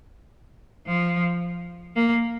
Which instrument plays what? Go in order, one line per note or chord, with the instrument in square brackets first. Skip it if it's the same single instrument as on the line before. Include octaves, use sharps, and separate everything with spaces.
[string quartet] F3
A#3